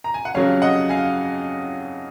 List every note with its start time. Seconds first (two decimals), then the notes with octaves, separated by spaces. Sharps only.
0.04 A#5
0.14 G#5
0.25 F#5
0.34 F2 C#3 F#3 C#5 F5
0.62 D#5 F#5
0.89 F5 G#5